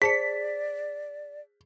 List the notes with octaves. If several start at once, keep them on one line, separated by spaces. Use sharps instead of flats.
G#4 C5 D5 A5 B6 C#7